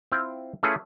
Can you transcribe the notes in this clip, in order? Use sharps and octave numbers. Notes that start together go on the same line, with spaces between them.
C4 E4 F4 G5
A3 C#4 E4 F4 G#4 B4